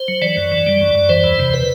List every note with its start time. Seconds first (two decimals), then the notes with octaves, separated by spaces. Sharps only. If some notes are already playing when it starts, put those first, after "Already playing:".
Already playing: C5
0.08 F#3
0.22 E3 D5
0.37 F#2
0.52 E3
0.66 G3
0.81 F#2
0.95 F#2
1.09 E3 C5
1.24 E2
1.39 C3
1.54 B4